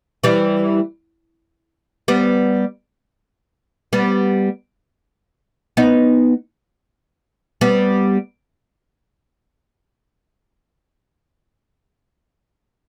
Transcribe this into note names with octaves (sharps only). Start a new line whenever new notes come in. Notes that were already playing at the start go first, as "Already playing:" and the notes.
E3 G3
G3 B3
G3 B3
B3 D#4
G3 B3